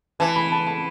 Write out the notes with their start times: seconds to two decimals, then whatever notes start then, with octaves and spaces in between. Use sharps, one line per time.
0.20 E3 A5
0.36 B5
0.51 A5
0.67 A5